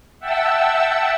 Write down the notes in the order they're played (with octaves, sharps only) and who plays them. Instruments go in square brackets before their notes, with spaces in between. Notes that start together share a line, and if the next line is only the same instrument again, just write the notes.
[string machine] E5 F#5 G5 A5 E6